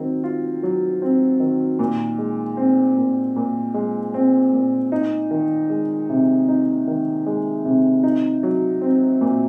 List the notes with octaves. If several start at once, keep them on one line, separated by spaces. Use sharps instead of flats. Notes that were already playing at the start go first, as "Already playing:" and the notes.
Already playing: D#3 F#3 C4
F4
F#3
C4
D#3
A#2
G#3
C4
A#2
A#2
G#3
C4
A#2
D#4
D#3
G#3
C3
D#4
D#3
G#3
C3
D#4
F#3
C4
A#2